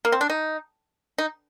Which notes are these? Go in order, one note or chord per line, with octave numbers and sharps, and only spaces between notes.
A#3
C4
D4
D#4
D#4